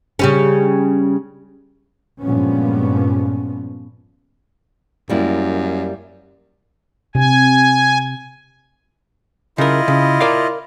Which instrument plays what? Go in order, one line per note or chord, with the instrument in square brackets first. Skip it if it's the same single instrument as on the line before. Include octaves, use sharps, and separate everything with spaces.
[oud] C#3 G3 C#4
[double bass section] G2 A#2 F3 G#3 B3 C#4
[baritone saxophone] F#2 [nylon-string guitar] G3 A#3 E4
[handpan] C3 [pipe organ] G#5
[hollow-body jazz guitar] C#3 A#4 [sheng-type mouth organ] E4 F4 D#5
[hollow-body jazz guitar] C#3
A#4 D5 F5